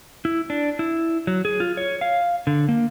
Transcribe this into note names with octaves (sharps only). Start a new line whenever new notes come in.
E4
D4
E4
F#3
G#4
F4
C#5
F5
D3
A#3